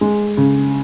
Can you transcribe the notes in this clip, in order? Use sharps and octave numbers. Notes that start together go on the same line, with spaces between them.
G#3
C#3